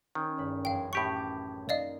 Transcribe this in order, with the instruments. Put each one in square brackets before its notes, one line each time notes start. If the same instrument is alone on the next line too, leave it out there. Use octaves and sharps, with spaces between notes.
[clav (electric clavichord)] D#3 [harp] C#4 C5 C#5
[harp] G#1 G2 B4
[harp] A1 F#2 [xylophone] F5 G5
[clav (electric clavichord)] A2 G4 F#5 [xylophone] C#6
[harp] D6
[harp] A#3 D#4 [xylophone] D5 D#5 F5